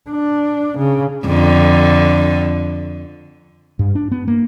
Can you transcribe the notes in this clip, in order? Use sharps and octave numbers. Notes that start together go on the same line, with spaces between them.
D4
C#3
F2 D3
G2
D4
B3
A#3